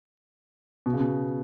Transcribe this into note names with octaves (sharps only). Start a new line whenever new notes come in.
B2
C#3
B2